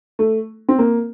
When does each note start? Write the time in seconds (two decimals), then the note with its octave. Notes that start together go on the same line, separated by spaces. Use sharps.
0.19 A3
0.69 C4
0.79 A#3